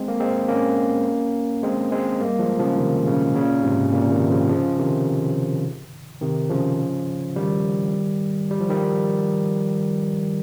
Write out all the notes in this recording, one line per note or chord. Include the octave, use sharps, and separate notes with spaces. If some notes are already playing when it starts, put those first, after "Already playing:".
Already playing: G#3 C4
A#3
G#3 C4
A#3 C#4
G#3 C4
G#3 C4
G3 A#3
F3 G#3
C#3 F3
C3 D#3
A#2 C#3
A#2 C#3
G#2 C3
A#2 C#3
C3 D#3
C#3 F3
C#3 F3
C3 D#3
C3 D#3
C#3 F3
D#3 G3
G3
F3
D#3 G3